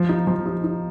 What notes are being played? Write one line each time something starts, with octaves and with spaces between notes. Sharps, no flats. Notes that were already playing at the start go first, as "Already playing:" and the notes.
Already playing: F3
D#4
F3
D#4
D#4